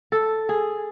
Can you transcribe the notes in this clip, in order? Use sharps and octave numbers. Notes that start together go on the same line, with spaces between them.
A4
G#4